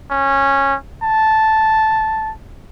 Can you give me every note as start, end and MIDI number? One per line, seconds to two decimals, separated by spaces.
0.11 0.76 61
1.03 2.31 81